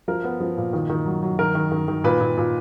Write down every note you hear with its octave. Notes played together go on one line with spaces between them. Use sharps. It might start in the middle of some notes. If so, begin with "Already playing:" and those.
F3 A#4
B3
F3
A#2
D#3
D#3
F#3
F#3
D#3 A#4
D#3
D#3
D#3
A#2 B4
A#2
A#2